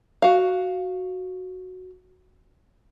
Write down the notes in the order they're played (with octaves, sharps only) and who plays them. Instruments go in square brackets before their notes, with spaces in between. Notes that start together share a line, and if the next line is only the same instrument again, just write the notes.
[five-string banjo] F#4 F5